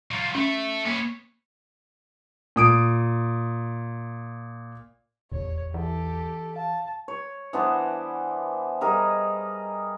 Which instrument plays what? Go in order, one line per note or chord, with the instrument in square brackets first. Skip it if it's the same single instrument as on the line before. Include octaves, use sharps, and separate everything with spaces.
[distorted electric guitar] F#3 F4
[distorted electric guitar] A3 [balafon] C#4
[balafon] A#3 [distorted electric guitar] B3 C#5
[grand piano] A#2 D#6 D7
[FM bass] D#1 [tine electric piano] A1 E2 [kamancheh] C#5
[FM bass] E3 [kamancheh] G4 A4
[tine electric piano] F5 [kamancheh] A5
[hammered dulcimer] C#5
E3 B3 D4 C5
G3 G#4 A#4 D#5